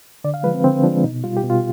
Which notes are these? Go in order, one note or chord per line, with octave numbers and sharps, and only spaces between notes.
D3 D5
F5
F3 G#3 B4
C4
D3 C4
F3 G#3 D4
B2 D#4
G3 F4
G4
B2
F4